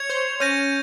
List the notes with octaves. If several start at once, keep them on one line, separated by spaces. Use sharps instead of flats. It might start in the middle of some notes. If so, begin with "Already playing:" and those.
Already playing: C#5 G#6 C#7 F7
C5
C#4 G6 A#6 D#7